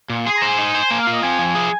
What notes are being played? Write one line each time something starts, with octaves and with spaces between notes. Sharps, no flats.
A#2
G#4 C6
A#5
C5
G#5
D#4
C5
A#3 G#5
F5
F4
D#5
C4 G#5
F3
G#4